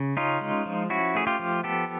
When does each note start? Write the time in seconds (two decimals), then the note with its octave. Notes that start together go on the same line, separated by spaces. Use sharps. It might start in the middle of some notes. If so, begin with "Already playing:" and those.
Already playing: C#3
0.17 C#4 D#4 F4
0.41 G#3
0.66 F3
0.90 C#4 E4 F#4
1.15 A3 G#4
1.27 F4 G4
1.39 F3
1.63 B3 G4 A4